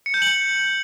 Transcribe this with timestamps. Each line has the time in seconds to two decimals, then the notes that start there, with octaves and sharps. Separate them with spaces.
0.06 C#7
0.14 G6
0.22 F#7